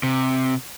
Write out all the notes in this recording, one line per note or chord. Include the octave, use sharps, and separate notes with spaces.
C3